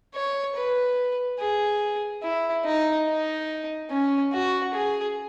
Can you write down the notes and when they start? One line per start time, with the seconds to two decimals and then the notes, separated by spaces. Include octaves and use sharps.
0.15 C#5
0.56 B4
1.39 G#4
2.23 E4
2.65 D#4
3.07 D#4
3.90 C#4
4.33 F#4
4.74 G#4